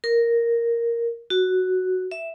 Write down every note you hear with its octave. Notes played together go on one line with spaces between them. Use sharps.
A#4
F#4
E5